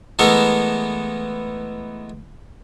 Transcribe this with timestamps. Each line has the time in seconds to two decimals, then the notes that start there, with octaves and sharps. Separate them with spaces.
0.19 E3 G#3 A3 B3 A4 A#4